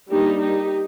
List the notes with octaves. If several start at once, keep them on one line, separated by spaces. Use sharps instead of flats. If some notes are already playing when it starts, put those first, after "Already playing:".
G3 A#3 D4 D#4 G4
D#4 G4